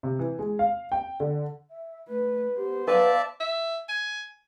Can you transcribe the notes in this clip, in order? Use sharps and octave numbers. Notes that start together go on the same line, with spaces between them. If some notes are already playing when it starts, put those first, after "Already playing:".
C3
E3
G#3
F5
G5
D3
E5
A3 B4
B3 G4 C5
F#3 B4 D5 E5 F5 A5
E5
G#5